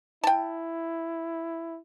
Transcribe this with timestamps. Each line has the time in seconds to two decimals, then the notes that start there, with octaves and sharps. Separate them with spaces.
0.24 E4 G5 A5